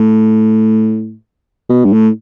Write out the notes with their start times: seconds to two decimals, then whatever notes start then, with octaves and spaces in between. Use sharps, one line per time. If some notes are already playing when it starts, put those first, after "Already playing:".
Already playing: A2
1.70 B2
1.85 G2
1.93 A2